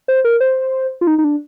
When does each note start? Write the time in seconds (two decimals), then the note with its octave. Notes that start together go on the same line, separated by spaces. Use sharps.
0.08 C5
0.25 A#4
0.40 C5
1.01 F4
1.07 D#4
1.18 D#4
1.24 D4